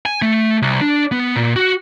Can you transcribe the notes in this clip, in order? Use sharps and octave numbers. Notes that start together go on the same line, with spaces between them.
G#5
A3
C2
D4
B3
A#2
F#4